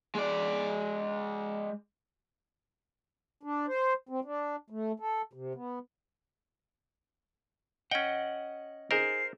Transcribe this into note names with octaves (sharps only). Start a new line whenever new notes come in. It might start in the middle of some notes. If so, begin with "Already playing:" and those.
G#3 D5
D4
C5
C4
D4
A3
A4
C3
B3
C#4 D#5 F#5 G5
D#4 G#4 A#4 C5 C7